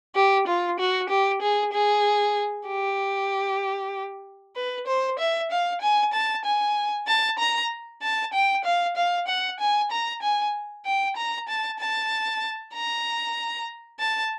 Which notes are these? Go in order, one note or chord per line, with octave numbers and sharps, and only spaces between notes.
G4
F4
F#4
G4
G#4
G#4
G4
B4
C5
E5
F5
G#5
A5
G#5
A5
A#5
A5
G5
F5
F5
F#5
G#5
A#5
G#5
G5
A#5
A5
A5
A#5
A5